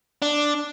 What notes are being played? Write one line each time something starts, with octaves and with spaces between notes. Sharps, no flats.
D4